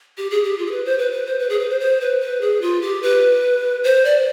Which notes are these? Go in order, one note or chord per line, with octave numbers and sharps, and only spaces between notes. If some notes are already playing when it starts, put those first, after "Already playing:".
G4
G#4
G4
F4
G#4
B4
C5
B4
B4
C5
B4
G#4
B4
C5
C5
B4
B4
G#4
F4
G4
B4
C5
D5